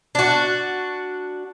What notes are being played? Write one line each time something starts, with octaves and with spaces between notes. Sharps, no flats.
D4 F#4